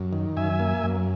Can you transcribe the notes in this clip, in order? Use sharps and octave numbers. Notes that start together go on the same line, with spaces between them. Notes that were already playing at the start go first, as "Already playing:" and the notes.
Already playing: F#2
D#3
F#2 E5 G#5
A#3
F#2